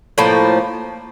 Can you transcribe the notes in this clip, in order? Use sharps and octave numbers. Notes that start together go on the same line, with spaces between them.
A2 F3 A#3